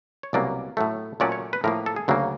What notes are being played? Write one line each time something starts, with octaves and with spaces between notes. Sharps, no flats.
C#5
C2 B2 F#3 A#3 C#4 D5
A2 F#3 A3
A#2 F#3 A3 C#4 D5
C#5
B4
A2 F3 A#3 A#4
A4
G#4
D2 C#3 F#3 A#3